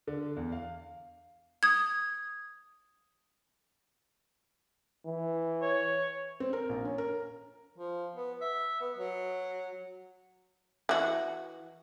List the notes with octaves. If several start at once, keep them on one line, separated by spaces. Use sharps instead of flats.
D3
E2
F5
D#6 G#6
E3
C#5
C4
A#4
A#1
C#4
A#4
F3
B3
E5
B3
F#3
E3 F#4